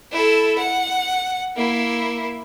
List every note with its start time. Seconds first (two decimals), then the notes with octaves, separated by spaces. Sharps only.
0.12 E4 A4
0.58 F#5
1.56 A#3 E4